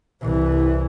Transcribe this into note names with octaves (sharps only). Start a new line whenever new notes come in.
C2 E3